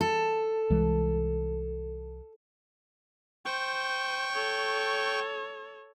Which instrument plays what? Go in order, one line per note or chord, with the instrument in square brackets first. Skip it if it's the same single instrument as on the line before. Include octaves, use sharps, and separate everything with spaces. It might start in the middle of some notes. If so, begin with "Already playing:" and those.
[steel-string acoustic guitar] A4
[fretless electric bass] C2 E3 G#3
[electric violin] C5 [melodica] G5 C#6
[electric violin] A4 C#5